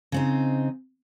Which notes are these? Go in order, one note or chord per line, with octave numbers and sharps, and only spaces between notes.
C#3 C4 D#4